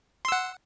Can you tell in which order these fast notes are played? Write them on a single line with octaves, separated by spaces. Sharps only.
C6 E6 F#5